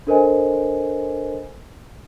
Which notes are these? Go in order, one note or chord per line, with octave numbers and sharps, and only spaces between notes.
D4 A4 A#4 C5 D#5 G#5